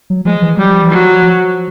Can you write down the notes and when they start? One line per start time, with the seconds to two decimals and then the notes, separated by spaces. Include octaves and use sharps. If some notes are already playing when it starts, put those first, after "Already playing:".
0.10 F#3
0.25 F3 G#3
0.42 E3
0.57 F#3 G3
0.70 F3
0.82 E3
0.90 F3 F#3
1.22 F3